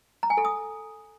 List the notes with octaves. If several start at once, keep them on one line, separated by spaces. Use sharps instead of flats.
A#5
G#5
A4
D#6